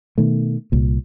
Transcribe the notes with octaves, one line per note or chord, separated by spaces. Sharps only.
B2 D#3 A3
C2 A#2